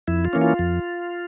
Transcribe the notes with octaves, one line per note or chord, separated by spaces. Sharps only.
F2 E4
F4
E3 A#3 C#4
F4
F2